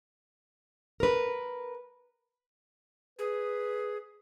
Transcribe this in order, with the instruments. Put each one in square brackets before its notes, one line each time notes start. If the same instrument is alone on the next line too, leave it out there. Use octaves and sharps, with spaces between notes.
[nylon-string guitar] A#4 B4
[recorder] G#4 [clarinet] B4